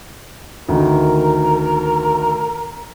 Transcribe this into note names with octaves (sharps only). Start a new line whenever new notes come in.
D2 D#3 A#4